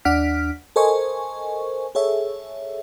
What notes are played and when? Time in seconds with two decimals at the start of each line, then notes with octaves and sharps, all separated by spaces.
0.05 D#2 D4 D5 F#5 F6 B6
0.76 A4 A#4 C5 D#5 G#5 C#6
1.95 G#4 A4 C#5 E5